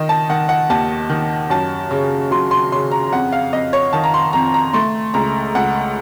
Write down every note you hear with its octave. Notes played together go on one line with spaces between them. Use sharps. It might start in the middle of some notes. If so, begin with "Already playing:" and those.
Already playing: D#3 D#5
A5
D#3 F#5
F#5
D#2 A5
D#3
F#2 A5
C#3
F#3 C6
C6
C#3 C6
A#5
F2 F#5
F5
F2 D#5
C#5
D#3 A5
A#5
C6
F2 A#5
A#5
A3 C6
C#2 A#5
C#2 F#5